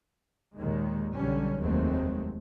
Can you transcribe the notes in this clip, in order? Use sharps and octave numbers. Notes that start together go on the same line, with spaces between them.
D#2 A#2 D#3 G#3
B1 D3 F#3 G3 C#4
F1 D#2 F#3 G#3 A3 C4